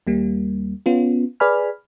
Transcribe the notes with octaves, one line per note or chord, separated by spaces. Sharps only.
D#2 G3 A#3
B3 C#4 F4
G#4 B4 D5 G#5 B5 F6